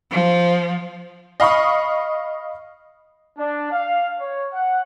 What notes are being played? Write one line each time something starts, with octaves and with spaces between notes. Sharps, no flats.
F3
D#5 F5 B5 C#6 D#6
D4
F5
C#5
F#5